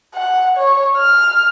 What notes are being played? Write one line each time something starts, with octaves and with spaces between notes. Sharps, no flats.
F#5
C#5
F6